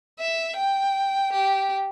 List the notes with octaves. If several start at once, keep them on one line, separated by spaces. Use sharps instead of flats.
E5
G5
G4